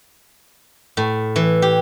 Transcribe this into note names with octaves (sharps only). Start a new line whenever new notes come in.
A2
E3
G4